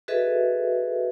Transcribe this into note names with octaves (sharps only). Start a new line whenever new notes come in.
F#4 G#4 A4 B4 D#5 E5